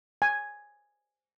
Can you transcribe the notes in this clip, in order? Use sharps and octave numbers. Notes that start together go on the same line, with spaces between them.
G#5